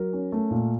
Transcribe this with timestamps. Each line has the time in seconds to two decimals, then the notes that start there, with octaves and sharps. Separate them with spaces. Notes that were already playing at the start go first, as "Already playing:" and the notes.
Already playing: F#3 A#4
0.13 C#4
0.32 A3
0.51 A#2